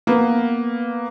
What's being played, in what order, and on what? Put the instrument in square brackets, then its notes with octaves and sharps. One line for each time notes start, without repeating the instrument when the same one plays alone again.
[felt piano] A#3 B3